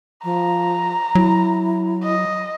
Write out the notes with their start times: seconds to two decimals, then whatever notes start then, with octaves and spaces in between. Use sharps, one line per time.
0.24 F3 A#5
1.15 F#3 E4
2.04 D#5